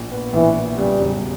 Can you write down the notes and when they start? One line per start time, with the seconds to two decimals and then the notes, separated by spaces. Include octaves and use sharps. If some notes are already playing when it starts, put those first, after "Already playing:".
Already playing: A#1
0.11 B3
0.33 A#1 E3
0.56 B3
0.78 C#3 G3
1.00 E1